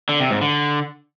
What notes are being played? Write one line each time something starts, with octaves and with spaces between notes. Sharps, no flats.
D3
C3
G#2
D3